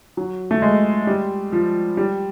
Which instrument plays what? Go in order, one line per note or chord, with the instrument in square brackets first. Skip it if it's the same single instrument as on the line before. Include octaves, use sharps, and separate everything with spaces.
[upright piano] F#3
A3
G#3
G3
F3
G3